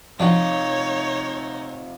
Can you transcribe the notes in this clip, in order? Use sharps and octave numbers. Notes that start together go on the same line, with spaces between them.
C3 F3 D4 D#4 F4 F#4 C#5